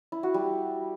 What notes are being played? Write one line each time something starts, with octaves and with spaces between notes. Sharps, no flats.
E4
F#4
G3